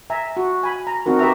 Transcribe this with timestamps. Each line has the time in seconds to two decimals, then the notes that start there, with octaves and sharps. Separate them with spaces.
0.10 E5 G#5 A#5
0.37 F#4
0.63 G#5 B5
0.87 A#5
1.06 C4 D#4 F#4 A#4
1.19 G4 B4 E5 A#5